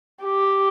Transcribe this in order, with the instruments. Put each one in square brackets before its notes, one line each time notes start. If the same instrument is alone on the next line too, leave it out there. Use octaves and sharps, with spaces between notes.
[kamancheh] G4